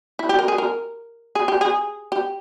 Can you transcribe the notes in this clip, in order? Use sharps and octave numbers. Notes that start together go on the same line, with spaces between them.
E4
G4
A#4
G#4
A#4
G#4
G4
G#4
G4